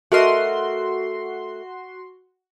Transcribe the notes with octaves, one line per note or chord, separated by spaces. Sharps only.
A3 F#4 A#4 D#5 C6